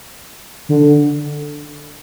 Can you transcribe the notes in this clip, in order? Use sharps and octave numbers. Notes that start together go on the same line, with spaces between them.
D3